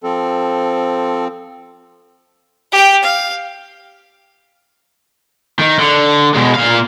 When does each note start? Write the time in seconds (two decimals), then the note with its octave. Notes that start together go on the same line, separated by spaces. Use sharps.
0.03 F3 C4 A4
2.72 G4 G5
3.03 F5
5.59 D#3
5.79 D3
6.35 B2 G#3
6.55 A#2 F5